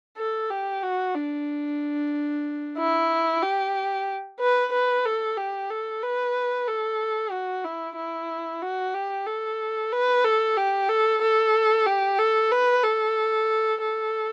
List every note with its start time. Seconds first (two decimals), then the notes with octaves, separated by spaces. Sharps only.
0.18 A4
0.50 G4
0.83 F#4
1.15 D4
2.78 E4
3.42 G4
4.40 B4
4.72 B4
5.05 A4
5.37 G4
5.70 A4
6.02 B4
6.67 A4
7.32 F#4
7.64 E4
7.96 E4
8.62 F#4
8.94 G4
9.27 A4
9.92 B4
10.24 A4
10.57 G4
10.89 A4
11.22 A4
11.86 G4
12.19 A4
12.51 B4
12.84 A4
13.81 A4